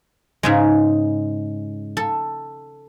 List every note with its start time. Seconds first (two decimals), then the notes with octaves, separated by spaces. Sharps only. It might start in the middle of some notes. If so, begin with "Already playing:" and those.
0.43 G#2 C#3 G#3
1.97 A4